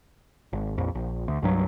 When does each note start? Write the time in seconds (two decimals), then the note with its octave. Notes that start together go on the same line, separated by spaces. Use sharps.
0.53 G#1
0.78 A#1 F2
0.95 A#1
1.28 D2
1.42 C2 G2 F#3